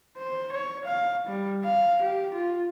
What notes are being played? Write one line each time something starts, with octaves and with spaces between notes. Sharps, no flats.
C5
C#5
F5
G3
F5
G4
F4